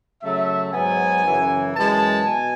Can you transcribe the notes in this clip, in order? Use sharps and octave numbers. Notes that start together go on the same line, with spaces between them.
C#3 F#3 A3 E5
G#2 F#3 B3 G#5
F#2 C#3 E3
F#2 E3 G#3 A5
B2 G#5